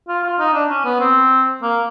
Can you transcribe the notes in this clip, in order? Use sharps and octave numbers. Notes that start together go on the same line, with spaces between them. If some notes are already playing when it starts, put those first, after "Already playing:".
F4
F4
D#4
D4
C#4
B3
C4
A#3